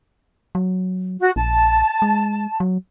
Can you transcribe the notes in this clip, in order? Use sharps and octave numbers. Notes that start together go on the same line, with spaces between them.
F#3
F#4
A#1 A5
G#3
F#3